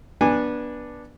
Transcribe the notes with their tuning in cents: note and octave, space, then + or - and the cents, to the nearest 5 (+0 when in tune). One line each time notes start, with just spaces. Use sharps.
B3 -20 D4 +0 G#5 -15